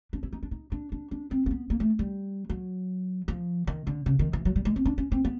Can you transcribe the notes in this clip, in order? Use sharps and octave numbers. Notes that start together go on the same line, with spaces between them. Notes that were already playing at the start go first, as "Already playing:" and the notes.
D4
E4
D#4
D4
D#4
D4
D4
D4
C4
C4
B3
A#3
A3
G3
F#3
F3
D#3
D3
C#3
D#3
E3
F#3
G3
G#3
C4
D4
C#4
C4
B3